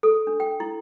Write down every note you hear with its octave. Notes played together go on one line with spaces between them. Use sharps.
A4
D4
G5
E4